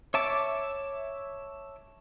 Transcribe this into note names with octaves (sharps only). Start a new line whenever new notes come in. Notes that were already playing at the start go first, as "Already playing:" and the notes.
C#5 E5 A5 D6